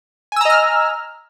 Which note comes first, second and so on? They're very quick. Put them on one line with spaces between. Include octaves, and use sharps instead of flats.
G#5 E6 A#5 D#5 F6